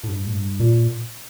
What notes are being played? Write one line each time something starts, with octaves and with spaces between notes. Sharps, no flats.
A2
G2
A2
G2
A#2